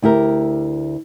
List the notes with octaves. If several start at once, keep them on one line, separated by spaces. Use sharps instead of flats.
D2 E4 G4 A#4